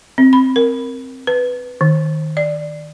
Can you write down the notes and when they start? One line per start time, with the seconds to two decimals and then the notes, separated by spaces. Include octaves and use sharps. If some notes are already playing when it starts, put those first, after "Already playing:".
0.18 C4
0.33 B5
0.56 A#4
1.27 B4
1.81 D#3
2.37 D5